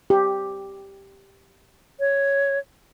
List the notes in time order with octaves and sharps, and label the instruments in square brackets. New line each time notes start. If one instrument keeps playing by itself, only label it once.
[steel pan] G4
[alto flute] C#5